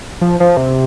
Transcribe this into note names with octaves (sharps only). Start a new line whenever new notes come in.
F3
F3
C3